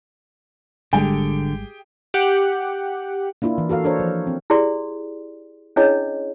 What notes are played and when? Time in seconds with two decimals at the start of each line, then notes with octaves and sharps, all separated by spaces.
0.93 G#1 D3 G3 G#3 G4 G#4 G5
2.14 G4 F#5
3.42 A#3 D4 E4 F4
3.58 E3
3.69 F#4 A4 A#4 F5
3.84 D4 A4 A#4 C5 C#5
4.00 F3
4.27 C4
4.50 E4 G4 G#4 D5 C6
5.76 C#4 D4 E4 G#4 C#5 D#5